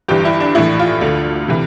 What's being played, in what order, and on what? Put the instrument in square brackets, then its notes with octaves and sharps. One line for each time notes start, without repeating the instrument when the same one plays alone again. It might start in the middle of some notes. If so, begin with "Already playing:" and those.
[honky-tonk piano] G1 G2 E3 G4
E4
D4
A#1 A2 E3 E4
F4
D2 D3
C3 E3